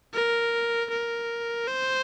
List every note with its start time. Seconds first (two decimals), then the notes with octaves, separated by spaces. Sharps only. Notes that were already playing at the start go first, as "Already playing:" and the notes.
0.14 A#4
0.90 A#4
1.68 C5